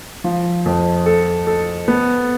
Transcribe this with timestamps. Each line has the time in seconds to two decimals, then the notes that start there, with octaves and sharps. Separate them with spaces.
0.24 F3
0.66 F2
1.06 A4
1.47 A4
1.88 B3